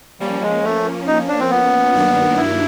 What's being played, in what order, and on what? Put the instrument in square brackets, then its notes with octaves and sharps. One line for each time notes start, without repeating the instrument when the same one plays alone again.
[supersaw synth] F3 A#3 C#4 [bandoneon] G3
[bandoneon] G#3
A3
D#4
D4
C4
B3
[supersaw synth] G2 D#3 F#3 A#3 D4
[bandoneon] E4